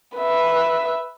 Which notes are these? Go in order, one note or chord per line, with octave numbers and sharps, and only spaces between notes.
B4 E5